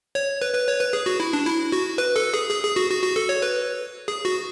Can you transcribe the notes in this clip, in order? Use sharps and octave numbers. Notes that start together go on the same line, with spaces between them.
C#5
B4
B4
C#5
B4
G#4
F#4
E4
D4
E4
F#4
B4
A4
G#4
G#4
G#4
F#4
F#4
F#4
A4
C#5
B4
G#4
F#4